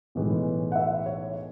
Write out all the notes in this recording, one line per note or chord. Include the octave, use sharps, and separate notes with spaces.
B1 A2 E3 G#3
F#5
E5
C#5